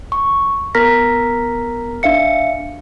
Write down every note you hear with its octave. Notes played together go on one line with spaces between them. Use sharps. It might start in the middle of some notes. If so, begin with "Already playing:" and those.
C#6
B3 A#4 A#5 F6 A#6 B6
D4 E5 F5 C#7